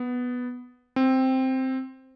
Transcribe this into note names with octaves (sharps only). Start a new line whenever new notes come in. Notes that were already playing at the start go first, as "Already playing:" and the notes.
Already playing: B3
C4